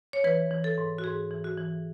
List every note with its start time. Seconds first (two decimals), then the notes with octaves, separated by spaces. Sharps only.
0.13 C#5
0.24 E3 B4
0.51 E3
0.64 A4
0.78 G#2
0.98 F#4
1.04 G#2 G#4
1.31 E3
1.44 F#4
1.57 E3